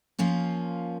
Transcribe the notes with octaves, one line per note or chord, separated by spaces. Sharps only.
F3 A#3 C#4 F4